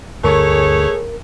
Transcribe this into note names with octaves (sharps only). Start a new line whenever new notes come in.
D2 G2 D3 A3 G#4 A#4 C#5